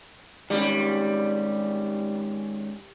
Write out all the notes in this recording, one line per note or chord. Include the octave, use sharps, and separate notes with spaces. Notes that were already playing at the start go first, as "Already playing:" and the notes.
G#2 D#3 G3 C#4